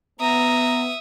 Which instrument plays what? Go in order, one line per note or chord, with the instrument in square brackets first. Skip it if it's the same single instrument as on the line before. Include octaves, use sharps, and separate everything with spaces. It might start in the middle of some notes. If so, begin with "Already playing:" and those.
[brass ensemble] B3 [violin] E5 D#6 [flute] A#5